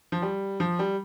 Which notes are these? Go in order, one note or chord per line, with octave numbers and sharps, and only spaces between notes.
F3
G3
F3
G3